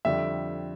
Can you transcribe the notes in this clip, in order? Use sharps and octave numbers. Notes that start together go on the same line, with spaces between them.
F2 D3 G3 E5